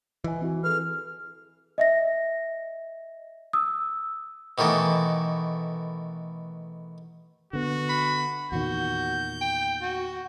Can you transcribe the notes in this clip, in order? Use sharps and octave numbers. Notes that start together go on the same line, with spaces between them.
E3 B4 D#5 G#5
C4 E4 F#4
G#4 A4 B4 F6
D#5 E5 A#6
D#6 E6
B2 D#3 E3 A3
D3 B3 F#4
B5
E2 A#2 D#3 F#4 G6
G5
F#4